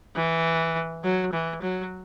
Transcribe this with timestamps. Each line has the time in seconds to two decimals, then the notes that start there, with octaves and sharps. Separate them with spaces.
0.16 E3
1.04 F#3
1.33 E3
1.62 F#3